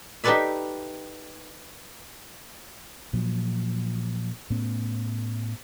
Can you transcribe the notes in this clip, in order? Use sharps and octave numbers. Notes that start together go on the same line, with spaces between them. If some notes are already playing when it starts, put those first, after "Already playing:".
D#4 G4 A4 B4 D5 E5
A#2 F3 F#3
A2 A3 B3 C#4